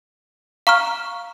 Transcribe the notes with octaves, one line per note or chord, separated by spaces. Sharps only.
F5 A#5 C#6 F6